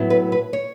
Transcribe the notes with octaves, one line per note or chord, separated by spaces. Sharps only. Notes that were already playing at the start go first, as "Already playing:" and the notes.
Already playing: A2 F#3 B3 E4
B4
B4
C#5